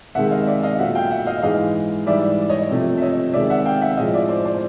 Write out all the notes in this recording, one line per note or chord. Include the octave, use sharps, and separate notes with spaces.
C3 D#3 G#3 E5 F#5
D#5 F5
D5 E5
D#5 F5
A#2 F#3 A3 E5 F#5
F5 G5
E5 F#5
D#5 F5
G#2 E3 G#3 D#5 F5
G#2 E3 G3 D5 E5
C#5 D#5
C3 F3 A3
E5
C#5 D#5
C3 D#3 G#3 D5 E5
E5 F#5
F5 G5
E5 F#5
A2 F3 G#3 D#5 F5
D5 E5
C5 D5
C5 D5